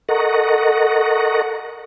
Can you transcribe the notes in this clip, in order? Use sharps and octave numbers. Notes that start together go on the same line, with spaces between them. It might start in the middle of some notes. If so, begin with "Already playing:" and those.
A4 A#4 D#5 F#5 A#5 C#6